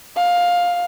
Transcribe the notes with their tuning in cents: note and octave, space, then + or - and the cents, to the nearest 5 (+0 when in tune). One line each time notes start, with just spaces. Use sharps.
F5 +15